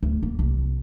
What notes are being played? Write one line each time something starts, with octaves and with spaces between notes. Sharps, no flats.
D2
A#3
C2